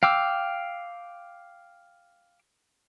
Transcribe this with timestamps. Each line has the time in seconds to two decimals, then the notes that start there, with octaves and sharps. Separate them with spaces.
0.03 F5 G5 D6 E6